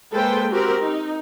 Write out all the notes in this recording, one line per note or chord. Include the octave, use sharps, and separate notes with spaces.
G#3 A#3 A4 B4 C5 G5
C4 F#4 G4 A#4
D#4